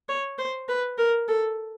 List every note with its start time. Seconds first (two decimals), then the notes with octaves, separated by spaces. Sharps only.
0.09 C#5
0.39 C5
0.69 B4
0.98 A#4
1.28 A4